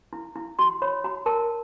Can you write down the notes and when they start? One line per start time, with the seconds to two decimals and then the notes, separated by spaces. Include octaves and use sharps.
0.13 E4
0.35 E4
0.59 F#4 C6
0.82 C#5 B5
1.04 F#4 A#5
1.26 A#4 A5